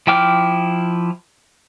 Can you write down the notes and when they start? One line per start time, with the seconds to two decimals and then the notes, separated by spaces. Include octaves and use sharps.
0.07 F3 E4 G5 D6 F6